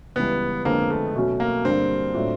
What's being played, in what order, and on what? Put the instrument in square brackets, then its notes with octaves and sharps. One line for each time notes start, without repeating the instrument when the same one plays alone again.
[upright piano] C#2 C#3 E3 G3 [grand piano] B3
[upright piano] F2 D3 F3 G#3 B3 [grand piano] A#3
[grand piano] A3
[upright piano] B2 F#3 A3 C#4 F#4
[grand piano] A#3
[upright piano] G2 D3 G3 A#3 [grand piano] C4
[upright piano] A2 F#3 A3 D4 F4